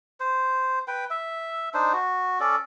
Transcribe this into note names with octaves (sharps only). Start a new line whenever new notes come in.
C5
B4 G5
E5
D4 D#4 C5
F#4
C#4 A4 D5